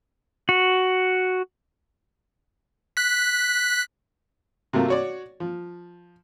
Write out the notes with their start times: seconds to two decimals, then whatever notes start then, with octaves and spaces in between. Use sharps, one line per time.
0.49 F#4
2.97 F#6 B6
4.73 C3 F#3 A3 A#3 F4
4.88 F#4 C#5 D5
5.40 F3